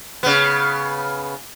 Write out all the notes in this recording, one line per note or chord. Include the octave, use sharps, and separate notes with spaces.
C#3 B3